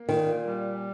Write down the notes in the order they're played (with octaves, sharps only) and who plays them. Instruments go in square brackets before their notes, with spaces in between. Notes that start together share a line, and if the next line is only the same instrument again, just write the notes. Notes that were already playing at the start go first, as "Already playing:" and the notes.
Already playing: [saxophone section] A#3
[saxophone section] A#2 [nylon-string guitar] D#3
[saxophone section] G3